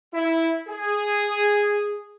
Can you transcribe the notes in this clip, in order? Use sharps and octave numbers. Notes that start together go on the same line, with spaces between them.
E4
G#4